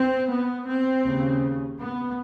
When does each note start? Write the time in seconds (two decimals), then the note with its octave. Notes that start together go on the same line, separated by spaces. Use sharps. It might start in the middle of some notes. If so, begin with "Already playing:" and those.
Already playing: C4
0.30 B3
0.67 C4
1.04 D#2 C#3
1.78 B3